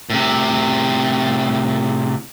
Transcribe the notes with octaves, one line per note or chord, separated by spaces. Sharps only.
A2 C3